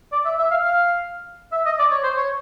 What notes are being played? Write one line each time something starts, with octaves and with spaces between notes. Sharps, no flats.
D5
E5
E5
F5
F5
E5
D#5
D5
C#5
C5
C#5